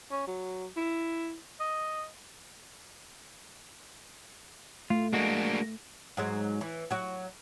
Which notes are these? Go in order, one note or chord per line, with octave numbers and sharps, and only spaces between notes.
C#4
F#3
E4
D#5
A3 F4
G#3 A#3 D4 F#4
G#2 F#3 G#3
E3
F#3 F#4